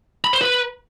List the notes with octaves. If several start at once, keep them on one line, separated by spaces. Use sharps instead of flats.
B5
C5
B4